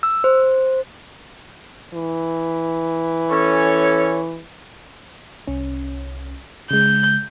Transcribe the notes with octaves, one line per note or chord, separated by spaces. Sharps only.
E6
C5
E3
C#4 A4 C#5
C2 C#4
C#3 G#3 G6